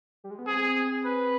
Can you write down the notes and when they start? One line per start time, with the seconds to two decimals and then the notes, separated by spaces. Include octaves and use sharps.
0.24 G3
0.31 G#3
0.39 B3
0.46 C4 G#4
1.04 B4